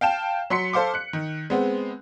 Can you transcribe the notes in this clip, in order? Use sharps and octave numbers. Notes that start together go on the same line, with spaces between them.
F5 G5 A5 E7
F#3 C6 B6 C#7
A4 C5 F5 C6 D6
F#6 C#7
D#3
G#3 B3 C4